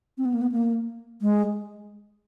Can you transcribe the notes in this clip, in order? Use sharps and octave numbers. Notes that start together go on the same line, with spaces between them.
C4
B3
A#3
B3
A#3
G#3